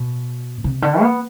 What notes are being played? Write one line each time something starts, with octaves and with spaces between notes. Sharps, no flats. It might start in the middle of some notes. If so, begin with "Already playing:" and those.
Already playing: B2
C3
D3
B3